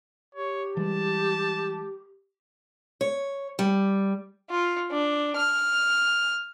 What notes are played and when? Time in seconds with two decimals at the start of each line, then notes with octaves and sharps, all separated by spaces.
0.35 G4 C#5
0.77 E3 G3 G#3 A5
3.01 C#5
3.59 G3
4.50 F4
4.91 D4
5.36 F6